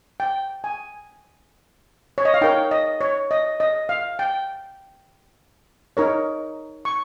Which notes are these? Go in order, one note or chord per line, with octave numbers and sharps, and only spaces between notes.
G5
G#5
C#5
D#5
F5
D#4 A#4 C#5 G5
D#5
C#5
D#5
D#5
F5
G5
D#4 A#4 C#5
C#6